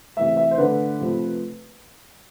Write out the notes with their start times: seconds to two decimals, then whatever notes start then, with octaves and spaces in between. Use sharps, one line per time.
0.16 C3 E3 A3 E5
0.37 E5
0.51 C5
0.58 D3 A3 B4
0.98 C3 F3 A3